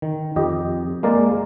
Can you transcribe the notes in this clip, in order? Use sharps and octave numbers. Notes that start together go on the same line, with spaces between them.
D#3
F2 G4 D#5
G#3 A#3 A#4 D5